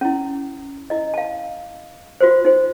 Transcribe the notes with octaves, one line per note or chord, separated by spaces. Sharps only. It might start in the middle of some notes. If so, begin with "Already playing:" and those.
C#4 E4
E4 D#5
F5 A5
F4 F#4 B4 C5
D#4 C5